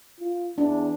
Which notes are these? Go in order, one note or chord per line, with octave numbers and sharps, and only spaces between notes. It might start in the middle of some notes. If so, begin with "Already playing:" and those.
F4
E2 D4